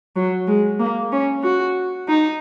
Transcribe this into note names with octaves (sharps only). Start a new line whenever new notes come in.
F#3
G#3
A#3
C#4
F#4
D#4